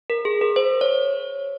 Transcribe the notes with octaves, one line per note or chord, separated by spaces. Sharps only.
A#4
G#4
A#4
C5
C#5